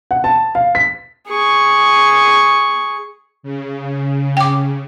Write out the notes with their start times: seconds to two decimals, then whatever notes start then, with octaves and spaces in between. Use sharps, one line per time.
0.11 F#5
0.24 A5
0.55 F5
0.75 B6
1.28 G#4 C#6
3.43 C#3
4.37 G5 D6